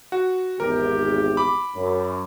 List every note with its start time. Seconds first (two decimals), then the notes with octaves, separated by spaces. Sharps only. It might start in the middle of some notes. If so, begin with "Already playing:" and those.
0.12 F#4
0.60 G#1 E2 G4 A#4
1.37 B5 D6
1.75 F#2